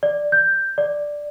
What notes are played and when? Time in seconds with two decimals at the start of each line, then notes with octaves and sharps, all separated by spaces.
0.03 D5
0.32 G6
0.78 D5